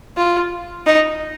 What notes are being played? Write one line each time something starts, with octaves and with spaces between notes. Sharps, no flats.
F4
D#4